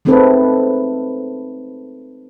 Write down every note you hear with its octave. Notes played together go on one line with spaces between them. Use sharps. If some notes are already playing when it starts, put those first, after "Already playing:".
G#3 A3 C4 D#4 A4 B4